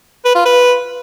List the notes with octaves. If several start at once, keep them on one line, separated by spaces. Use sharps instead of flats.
B4
F4
B4